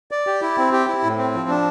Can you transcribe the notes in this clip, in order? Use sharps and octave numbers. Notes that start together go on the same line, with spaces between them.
D5
G4
E4
C4
G4
E4
A2
C4
F3
D4